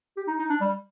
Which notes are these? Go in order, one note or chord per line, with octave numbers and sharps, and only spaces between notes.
G4
D#4
D#4
D4
G3